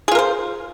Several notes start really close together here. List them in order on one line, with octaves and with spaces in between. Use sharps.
G#4 F4 A#4 C5